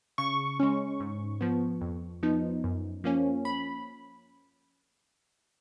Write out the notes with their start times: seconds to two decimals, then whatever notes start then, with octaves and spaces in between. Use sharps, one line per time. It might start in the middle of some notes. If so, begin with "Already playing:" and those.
0.18 C#3 C#6
0.60 G#3 C#4
1.00 G#2
1.41 F3 B3
1.81 F2
2.23 F3 B3 D#4
2.64 F#2
3.04 F3 A#3 C#4
3.45 B5